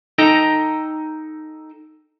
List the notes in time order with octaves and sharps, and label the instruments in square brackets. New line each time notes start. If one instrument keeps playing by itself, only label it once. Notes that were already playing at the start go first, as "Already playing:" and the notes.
[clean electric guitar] D#4 A4 D#5 G5 A#5